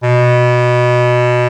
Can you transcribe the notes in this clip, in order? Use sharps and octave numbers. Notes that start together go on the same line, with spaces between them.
B2